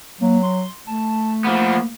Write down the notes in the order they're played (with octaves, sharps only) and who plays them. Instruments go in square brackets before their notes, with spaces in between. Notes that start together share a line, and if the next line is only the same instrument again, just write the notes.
[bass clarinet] F#3 [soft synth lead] A#3
[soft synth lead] C6
[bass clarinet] A3 [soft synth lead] A5
[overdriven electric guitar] F3 B3 [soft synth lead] A#3